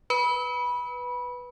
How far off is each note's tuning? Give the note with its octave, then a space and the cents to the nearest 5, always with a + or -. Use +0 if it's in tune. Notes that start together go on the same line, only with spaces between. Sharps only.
B4 +0 B5 -15